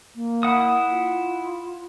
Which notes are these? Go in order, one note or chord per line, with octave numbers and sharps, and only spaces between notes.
A#3
E4 F#5 D#6
F4